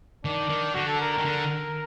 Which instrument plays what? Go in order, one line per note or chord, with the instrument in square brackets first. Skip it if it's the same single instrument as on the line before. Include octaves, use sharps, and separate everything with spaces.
[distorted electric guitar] D#3 [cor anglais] D4
[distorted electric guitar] D#3
[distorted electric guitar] D3 [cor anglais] F#4
[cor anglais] A4
A#4
[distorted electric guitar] D#3 [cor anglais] A#4
[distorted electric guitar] D3